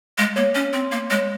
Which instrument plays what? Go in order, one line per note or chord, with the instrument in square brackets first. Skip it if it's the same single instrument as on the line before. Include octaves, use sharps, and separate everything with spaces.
[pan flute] G#3 [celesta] F5
[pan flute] A#3 [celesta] C#5
[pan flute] C#4 [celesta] C#5
[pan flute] C4 [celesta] C6
[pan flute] A#3 [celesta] F5
[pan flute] G#3 [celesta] C#5